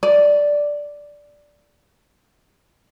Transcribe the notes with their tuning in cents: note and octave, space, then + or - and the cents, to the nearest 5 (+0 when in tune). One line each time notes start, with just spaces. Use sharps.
D5 -5